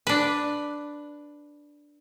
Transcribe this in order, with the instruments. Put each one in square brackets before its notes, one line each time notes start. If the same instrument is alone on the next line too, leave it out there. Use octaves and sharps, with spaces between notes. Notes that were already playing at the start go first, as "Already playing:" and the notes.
[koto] D4 B4